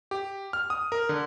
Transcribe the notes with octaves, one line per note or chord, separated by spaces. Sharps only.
G4
F6
D#6
A#4
D3